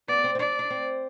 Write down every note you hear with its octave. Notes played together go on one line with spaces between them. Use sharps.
B3 D5
C4
C4
D4 D5
D4
C4